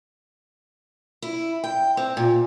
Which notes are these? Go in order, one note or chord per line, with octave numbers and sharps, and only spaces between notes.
E4
G5
C4
A#2